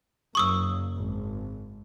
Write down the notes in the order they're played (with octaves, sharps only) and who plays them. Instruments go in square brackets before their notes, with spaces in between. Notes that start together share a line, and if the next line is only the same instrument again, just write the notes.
[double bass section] F#1 F#3 A#3 [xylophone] C#6 D#6 E6
[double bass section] G#1